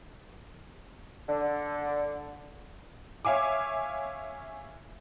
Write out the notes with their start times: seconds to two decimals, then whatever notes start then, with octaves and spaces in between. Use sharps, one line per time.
1.28 D3
3.25 C#5 E5 F5 G#5 D6